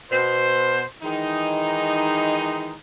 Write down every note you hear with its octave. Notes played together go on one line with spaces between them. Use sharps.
B2 C5
D#3 E3 G#3 D#4